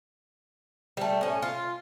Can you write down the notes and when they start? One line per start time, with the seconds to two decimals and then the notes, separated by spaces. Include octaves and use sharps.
0.97 G3 A3
1.21 A2 C#4
1.42 F4